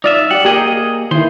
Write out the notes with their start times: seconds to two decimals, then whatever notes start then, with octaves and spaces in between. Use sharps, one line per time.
0.04 D#4 F4 D5 E5
0.31 G4 D5 F#5
0.45 A#3 G4 G#4 A#4 D#5
1.11 D#2 D#3 E4 C5 C6